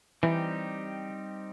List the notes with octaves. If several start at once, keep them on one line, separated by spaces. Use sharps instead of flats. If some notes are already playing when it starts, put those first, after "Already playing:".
E3 G3 C4 D#4 G4